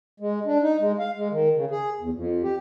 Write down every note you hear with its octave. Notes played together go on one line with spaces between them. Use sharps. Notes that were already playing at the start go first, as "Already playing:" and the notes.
G#3
D4
D#4
G#3
F5
G#3
D#3
C#3
G#4
E2
F2
G4